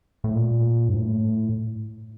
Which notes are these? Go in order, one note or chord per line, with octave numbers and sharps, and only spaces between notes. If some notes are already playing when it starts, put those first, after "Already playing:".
A2
A#2
G2
A2